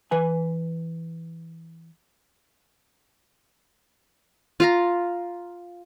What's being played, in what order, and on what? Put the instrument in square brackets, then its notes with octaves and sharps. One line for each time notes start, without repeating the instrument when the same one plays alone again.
[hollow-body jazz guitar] E3 B4 G#5
[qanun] F4 F5 A#5